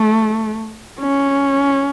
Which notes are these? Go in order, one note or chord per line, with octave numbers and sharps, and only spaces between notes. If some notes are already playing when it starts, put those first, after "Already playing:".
Already playing: A3
C#4